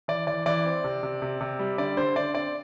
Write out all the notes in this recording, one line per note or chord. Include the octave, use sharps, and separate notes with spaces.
E3 D5
E3 D5
E3 D5
C4
C3
C3
C3
C3
G3
D3 D5
D3 C5
D3 D5
C4 D5